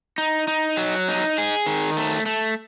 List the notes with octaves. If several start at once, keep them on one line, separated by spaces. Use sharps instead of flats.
D#4
D#4
F#3
D#4
G#4
D#3
A3
A3